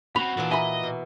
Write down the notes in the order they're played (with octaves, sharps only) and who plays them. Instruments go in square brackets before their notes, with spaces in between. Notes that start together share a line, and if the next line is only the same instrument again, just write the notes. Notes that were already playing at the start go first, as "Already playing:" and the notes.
[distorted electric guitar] C4 C#4 [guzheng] F#4 [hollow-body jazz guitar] B5 [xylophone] F7
[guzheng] A#2 E3 A#3 [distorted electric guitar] D4 F#4
[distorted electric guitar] D#5 [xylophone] E5 [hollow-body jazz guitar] G#5 A#5 B5
[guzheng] B2